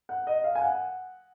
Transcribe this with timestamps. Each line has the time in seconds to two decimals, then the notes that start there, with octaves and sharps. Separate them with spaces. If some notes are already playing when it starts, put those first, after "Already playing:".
0.09 F#5
0.27 D#5
0.44 F5
0.55 G#5
0.62 F#5